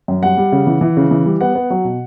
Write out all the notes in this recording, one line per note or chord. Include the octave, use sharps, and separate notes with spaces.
F#2
G3 F#5
G3
C#3
E3
E3
C#3
E3
G3
B3 F#5
B3
F#3
B2